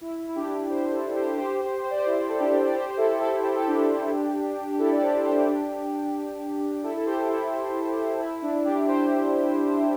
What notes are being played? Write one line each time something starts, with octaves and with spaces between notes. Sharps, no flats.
E4
E4
D4 G4
G4 C5
C5
E4 A4
G4 C5
G4 C5
G4 C5
C5
D5
G4 C5
E4
A4
D4 G4
D5
G4 C5
C5
E4 A4
E4 A4
G4
A4
D4 G4
G4
E4 A4
D5
G4 C5
G4 C5
D4 G4
E4 A4
A4
G4 C5
E4 A4
E4
D4
D4 G4
G4 C5